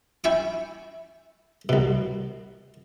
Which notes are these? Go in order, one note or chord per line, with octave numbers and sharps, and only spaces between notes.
E4 G5 G#5 C#6 D6
C2 B2